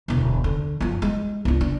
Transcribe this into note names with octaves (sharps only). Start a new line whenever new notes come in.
E1 D2
D3
F#2 F3
G#3
C#2 D4
D4